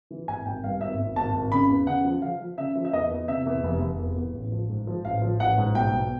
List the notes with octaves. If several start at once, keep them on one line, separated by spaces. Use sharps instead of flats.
E3
G#1 G#5
G#1 G5
G2 F5
G#1 E5
G#1
G#1 A5
G#1
C#3 B5
E2
C#3 F#5
F3
F3 F5
F3
C#3 E5
F3
E5
E2 D#5
E2
C3 E5
E2
F1
F1
E2
E2
A1
F3
G#2
F3
A1 F5
F3
A1 F#5
G#2
B1 G5
B1